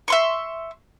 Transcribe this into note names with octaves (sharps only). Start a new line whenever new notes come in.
E5 C6 C#6